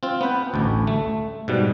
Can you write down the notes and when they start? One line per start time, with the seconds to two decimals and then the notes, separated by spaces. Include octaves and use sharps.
0.03 C4 F4
0.21 B3 B4 G5
0.54 A1 D2
0.87 A3
1.48 G#2 B2 G3